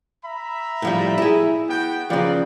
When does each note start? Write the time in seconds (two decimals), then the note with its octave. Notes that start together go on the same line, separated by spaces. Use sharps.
0.24 E5 A#5 B5
0.82 A2 F3 G3
1.18 E4 G#4
1.69 B3 F#4 G5
2.10 C#3 F3 A#4 B4 D5